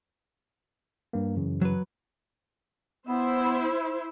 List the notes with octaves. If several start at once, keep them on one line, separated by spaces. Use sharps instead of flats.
G2 A#3
F#2 C#3 E3
F#3 B4
B3 E4 C5